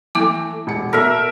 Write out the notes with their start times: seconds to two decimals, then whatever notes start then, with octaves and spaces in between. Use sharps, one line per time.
0.15 E3 A3 A#3 E4 D6
0.67 E1 C#7
0.93 B2 A4 A#4 E5